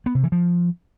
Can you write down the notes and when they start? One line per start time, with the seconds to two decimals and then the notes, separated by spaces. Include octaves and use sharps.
0.06 B3
0.15 C3
0.23 E3
0.32 F3